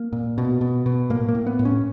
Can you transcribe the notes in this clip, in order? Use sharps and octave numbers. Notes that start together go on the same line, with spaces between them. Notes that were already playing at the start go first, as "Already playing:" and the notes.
Already playing: A#3
A#2
B2
B2
B2
A2 A#3
A#3
A2
B3
A2
C#4